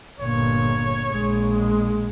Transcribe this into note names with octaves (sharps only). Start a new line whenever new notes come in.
G1 A#2 C#5
A#1 G#3